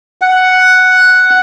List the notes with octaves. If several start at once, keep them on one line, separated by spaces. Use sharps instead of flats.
F#5